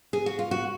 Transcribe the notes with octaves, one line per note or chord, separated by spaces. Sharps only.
G#4
F#4
F4
F#4